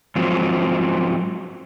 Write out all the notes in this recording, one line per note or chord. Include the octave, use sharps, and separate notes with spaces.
G#2 F3 F#3 C4